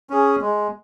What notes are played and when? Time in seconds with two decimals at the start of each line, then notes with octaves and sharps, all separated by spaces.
0.10 C#4 G#4
0.42 G#3